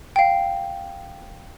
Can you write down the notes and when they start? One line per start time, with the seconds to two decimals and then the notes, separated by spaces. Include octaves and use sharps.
0.16 F5 G5